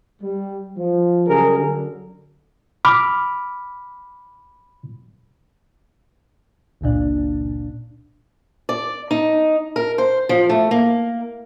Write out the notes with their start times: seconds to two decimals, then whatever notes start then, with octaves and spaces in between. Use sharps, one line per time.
0.22 G3
0.77 F3
1.27 C#3 F#3 G3 G#4 A#4
1.59 F#2 D3
2.85 B5 D6 F6
6.81 G1 C#2 A#2 D4
8.69 D5
9.11 D#4
9.76 A#4
9.98 C5
10.29 F3
10.49 A3
10.71 A#3